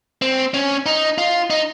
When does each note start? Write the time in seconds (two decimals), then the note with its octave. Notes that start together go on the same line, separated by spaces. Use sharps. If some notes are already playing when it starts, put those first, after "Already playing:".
0.22 C4
0.54 C#4
0.86 D#4
1.18 F4
1.50 D#4